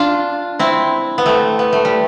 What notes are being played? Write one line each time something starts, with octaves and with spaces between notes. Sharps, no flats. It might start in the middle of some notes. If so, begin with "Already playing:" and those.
Already playing: D4 F4
C4 E4
B3
A3 C4
B3
A3
G3